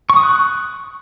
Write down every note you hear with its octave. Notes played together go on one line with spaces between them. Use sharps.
C#6
D#6
F#6